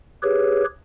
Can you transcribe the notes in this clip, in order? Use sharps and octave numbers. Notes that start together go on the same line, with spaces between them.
G4 G#4 B4 C#5